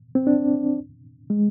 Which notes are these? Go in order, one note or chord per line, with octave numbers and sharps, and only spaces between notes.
C4
D4
G#3